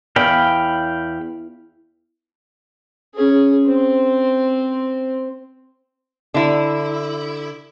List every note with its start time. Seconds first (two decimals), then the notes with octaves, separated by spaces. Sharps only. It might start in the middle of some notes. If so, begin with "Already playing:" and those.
0.16 E2 F5 G5 B5
3.15 C#4 G#4
3.66 C4 C5
6.34 D3 E4